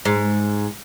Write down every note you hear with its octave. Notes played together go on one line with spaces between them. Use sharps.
G#2